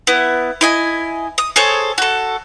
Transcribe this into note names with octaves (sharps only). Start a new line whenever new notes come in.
B3 E4
E4 D#5 G#5
D#6
G#4 A4 C5 C#5
F#4 A4